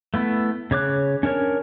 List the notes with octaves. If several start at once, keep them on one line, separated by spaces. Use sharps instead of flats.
A3 B3 E4
C#3 C#5 D6 F#6
C#4 D4 A#4 C#5